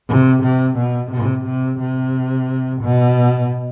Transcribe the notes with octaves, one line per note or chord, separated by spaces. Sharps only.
C3
C3
B2
C3
C3
C3
B2